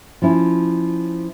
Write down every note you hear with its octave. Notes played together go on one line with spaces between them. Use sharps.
F3 C#4 E4